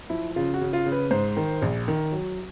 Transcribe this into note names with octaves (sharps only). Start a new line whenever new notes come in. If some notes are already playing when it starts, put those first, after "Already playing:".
F3 E4
C#3 F4
F#4
C#3
F4
C#3
B4
G#2 C5
D#3
A#1
D#3
F#3